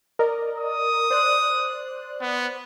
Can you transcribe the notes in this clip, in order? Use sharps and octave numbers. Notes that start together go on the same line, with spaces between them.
A#4 D5 D#5
D#6
C5 D5 F#6
B3